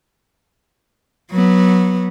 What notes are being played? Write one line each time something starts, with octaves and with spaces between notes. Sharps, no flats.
F#3 B3